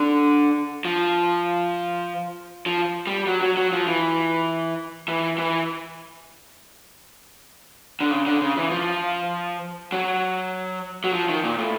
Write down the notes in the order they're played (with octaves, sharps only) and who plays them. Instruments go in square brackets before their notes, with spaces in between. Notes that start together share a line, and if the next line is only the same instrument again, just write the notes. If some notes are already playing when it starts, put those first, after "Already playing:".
Already playing: [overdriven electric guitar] D3
F3
F3
G3
F#3
F#3
F#3
F3
E3
E3
E3
D3
C#3
D3
C#3
E3
F3
F#3
F#3
F3
D#3
A#2
A2